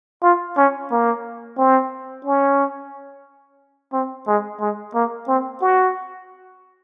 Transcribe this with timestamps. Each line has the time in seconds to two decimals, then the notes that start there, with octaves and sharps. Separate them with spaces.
0.23 F4
0.57 C#4
0.91 A#3
1.58 C4
2.25 C#4
3.93 C4
4.26 G#3
4.60 G#3
4.94 A#3
5.27 C4
5.61 F#4